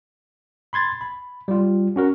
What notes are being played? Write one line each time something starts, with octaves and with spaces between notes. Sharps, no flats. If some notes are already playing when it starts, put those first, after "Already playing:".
B5 C6 G#6 A6
B5
G3 F4
C#4 F#4 A#4